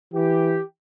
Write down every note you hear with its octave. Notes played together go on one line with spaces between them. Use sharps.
E3 G4